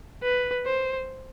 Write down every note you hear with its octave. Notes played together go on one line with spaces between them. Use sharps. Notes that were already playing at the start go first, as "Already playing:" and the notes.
B4
C5